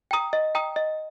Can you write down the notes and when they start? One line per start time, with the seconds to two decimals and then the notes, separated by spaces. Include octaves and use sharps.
0.11 G5 A#5 D#6
0.33 D#5
0.55 G5 A#5 D#6
0.76 D#5